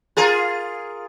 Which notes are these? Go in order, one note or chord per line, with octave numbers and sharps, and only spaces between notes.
F4 G#4 A#4